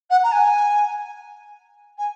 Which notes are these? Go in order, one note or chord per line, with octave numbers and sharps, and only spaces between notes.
F#5
A#5
G#5
G#5